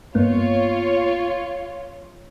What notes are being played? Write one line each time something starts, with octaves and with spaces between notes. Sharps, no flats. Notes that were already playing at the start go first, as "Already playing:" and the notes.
G2 A#3 B3 F4 C#5